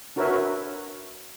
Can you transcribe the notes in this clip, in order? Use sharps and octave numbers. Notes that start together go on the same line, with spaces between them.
D4 F#4 A#4 B4 C#5 E5